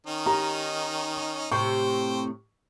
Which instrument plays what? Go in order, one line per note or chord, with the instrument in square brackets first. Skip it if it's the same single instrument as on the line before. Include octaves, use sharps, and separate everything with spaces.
[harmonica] D#3 C#4 D#4
[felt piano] G4 A#5
[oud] A2 C3 [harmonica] C5 G5 [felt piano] C#6